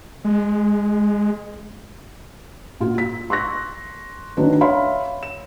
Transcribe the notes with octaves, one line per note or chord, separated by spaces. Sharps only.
G#3
A#2 F4 F#4
B6
C6 C#6 F#6 A#6
D#3 F#3 D4 B4
C#5 E5 F5 B5 C6
E7